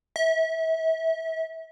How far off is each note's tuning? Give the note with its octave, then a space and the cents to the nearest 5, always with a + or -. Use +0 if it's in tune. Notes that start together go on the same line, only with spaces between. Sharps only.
E5 -30